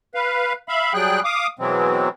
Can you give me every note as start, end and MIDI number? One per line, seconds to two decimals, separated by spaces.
0.15 0.53 71
0.15 0.53 77
0.69 0.93 76
0.69 0.93 77
0.69 0.93 83
0.94 1.20 54
0.94 1.20 55
0.94 1.20 68
0.94 1.20 79
0.94 1.20 90
1.24 1.47 77
1.24 1.47 86
1.24 1.47 87
1.59 2.09 47
1.59 2.09 52
1.59 2.09 54
1.59 2.09 56
1.59 2.09 60